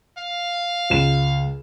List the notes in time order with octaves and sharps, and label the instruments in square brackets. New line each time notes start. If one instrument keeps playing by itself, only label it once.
[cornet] F5
[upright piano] C#2 E7